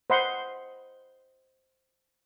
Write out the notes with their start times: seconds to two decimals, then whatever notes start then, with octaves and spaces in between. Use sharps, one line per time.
0.10 C5 D#5 F#5 B5 C6